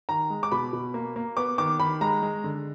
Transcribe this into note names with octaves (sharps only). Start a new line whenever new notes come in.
D#3 A#5
G#3
D6
B2 B5
B2
A#3
A#3
B3 D6
D#3 D6
D#3 B5
G#3 A#5
G#3
D3